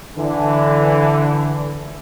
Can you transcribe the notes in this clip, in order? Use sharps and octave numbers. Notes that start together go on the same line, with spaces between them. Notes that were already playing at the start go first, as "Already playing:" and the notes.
D3 E3